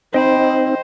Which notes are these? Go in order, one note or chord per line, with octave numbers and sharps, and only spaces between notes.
C4 D#4 C5 D#5 G5 B5